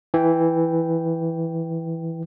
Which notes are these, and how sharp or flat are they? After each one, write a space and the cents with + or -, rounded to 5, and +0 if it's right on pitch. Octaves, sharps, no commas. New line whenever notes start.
E3 +0 G5 +0